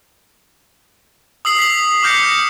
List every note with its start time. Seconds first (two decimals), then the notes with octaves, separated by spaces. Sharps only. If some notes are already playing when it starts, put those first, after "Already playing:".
1.45 D#6 E6 C7 F#7
1.59 B6 C7 F#7
2.03 D6 F6 G6 A#6 C#7